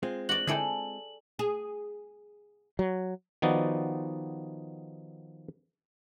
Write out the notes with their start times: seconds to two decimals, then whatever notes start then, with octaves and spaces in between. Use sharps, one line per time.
0.03 G#3 C4 F4
0.29 F#4 D5 F#7
0.47 D3 E4 G#4 A4 D5 G5
1.39 G#4
2.79 F#3
3.42 D#3 F3 B3 D#4 F#4 D5